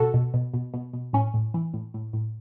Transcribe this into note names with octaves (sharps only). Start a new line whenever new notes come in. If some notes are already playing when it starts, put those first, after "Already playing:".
Already playing: B2 F#4 A4
B2
B2
B2
B2
B2
A2 C#4
A2
E3
A2
A2
A2